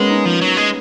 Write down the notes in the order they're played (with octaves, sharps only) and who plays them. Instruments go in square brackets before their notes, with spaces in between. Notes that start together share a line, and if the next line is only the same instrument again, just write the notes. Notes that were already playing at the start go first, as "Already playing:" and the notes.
Already playing: [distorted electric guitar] G#3 [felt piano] A#3 B3 C#4
[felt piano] D#4
[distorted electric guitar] F3
F#3
G#3